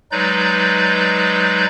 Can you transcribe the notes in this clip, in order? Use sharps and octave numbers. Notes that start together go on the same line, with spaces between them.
F#3 G#3 D#4 B4 D5 G6